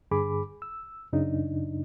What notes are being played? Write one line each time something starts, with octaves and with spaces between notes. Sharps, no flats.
G2 D3 G#4 B5 D6
E6
F#2 C#3 D4 D#4